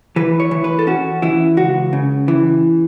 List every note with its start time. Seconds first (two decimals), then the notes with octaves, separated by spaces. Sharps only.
0.16 E3 B4
0.40 C#5
0.51 E3
0.64 B4
0.79 A4
0.87 C#4 F#4
1.22 E3 E4
1.57 C#2 F#4
1.93 C#3
2.28 E3